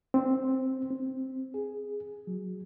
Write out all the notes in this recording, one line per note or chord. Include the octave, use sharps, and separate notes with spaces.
C4
C4
G#4
F#3